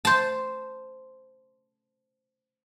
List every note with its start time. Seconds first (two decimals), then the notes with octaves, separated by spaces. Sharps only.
0.05 C5 A5